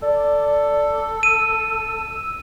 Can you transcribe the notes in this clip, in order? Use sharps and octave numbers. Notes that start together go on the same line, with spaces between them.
A4 D5
E6 D#7